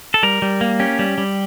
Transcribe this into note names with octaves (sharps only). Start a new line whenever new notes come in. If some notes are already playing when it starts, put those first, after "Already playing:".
A4
G3 A#4
G3
A#3
C#4 G4
G3
G3